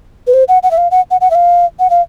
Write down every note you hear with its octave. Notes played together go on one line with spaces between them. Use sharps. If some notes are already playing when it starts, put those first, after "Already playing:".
B4
C5
F#5
F#5
E5
F5
F#5
F#5
F#5
E5
F5
F#5
F5